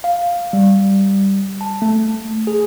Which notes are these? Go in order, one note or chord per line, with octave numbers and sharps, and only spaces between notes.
F5
G3
A5
A3
G#4